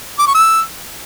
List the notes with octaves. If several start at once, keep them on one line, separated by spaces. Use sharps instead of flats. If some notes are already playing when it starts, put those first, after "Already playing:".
D6
C#6
E6